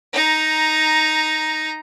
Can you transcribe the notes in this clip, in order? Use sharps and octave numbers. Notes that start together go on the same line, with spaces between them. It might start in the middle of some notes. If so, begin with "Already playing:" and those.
D#4 A#5